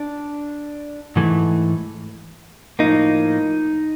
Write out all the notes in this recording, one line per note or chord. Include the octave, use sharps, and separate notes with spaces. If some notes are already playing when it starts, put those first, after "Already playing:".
Already playing: D4
G#2 E3 A3
A2 F3 A#3 D#4